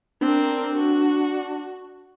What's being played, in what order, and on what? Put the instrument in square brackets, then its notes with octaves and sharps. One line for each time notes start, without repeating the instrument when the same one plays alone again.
[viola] C4 A#4 [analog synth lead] D4
[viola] F#4